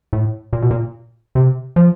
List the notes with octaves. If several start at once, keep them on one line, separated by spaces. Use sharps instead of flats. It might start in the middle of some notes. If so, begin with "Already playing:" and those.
A2
A#2
B2
A#2
C3
F3